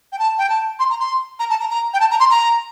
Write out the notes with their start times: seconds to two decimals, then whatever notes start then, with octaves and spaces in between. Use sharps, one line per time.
0.12 G5
0.19 A5
0.38 G5
0.49 A5
0.79 C6
0.90 A#5
1.00 C6
1.39 A#5
1.50 A5
1.60 A#5
1.70 A#5
1.93 G5
2.00 A5
2.10 A#5
2.20 C6
2.30 A#5